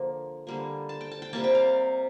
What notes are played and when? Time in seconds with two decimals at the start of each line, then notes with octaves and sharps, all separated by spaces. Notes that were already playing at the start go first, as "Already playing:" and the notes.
Already playing: D3 F3 A#3
0.47 D3 G3 A#3
0.89 A5
1.01 G5
1.11 A5
1.22 G5
1.33 C3 G3 A#3 A5
1.44 G5
1.55 F5